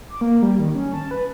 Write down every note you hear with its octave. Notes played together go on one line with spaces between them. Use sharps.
D6
A#3
G3
D#3
C#4
A5
B4